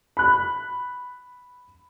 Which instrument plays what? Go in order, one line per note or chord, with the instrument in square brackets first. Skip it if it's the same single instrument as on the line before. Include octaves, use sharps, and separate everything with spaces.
[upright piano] B5 F#6